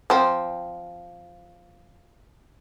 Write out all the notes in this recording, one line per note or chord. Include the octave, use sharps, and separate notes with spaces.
F3 C4